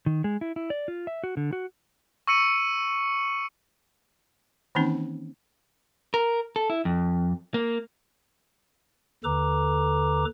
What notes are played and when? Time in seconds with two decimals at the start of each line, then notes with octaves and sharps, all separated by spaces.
0.06 D#3
0.24 G#3
0.41 E4
0.56 E4
0.70 D5
0.88 F4
1.07 E5
1.24 F#4
1.37 D3
1.53 F#4
2.27 C#6 E6 C#7 D#7
4.75 D#3 E3 A#3 C4 C#4 D#4
6.14 A#4
6.56 A4
6.70 E4
6.85 F2
7.54 A#3
9.24 D#2 D3 A4 B4 A#5 D6